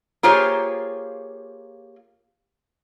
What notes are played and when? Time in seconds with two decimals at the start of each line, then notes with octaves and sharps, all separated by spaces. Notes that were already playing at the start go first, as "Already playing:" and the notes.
0.23 A#3 F4 G4 G#4 C5 C#5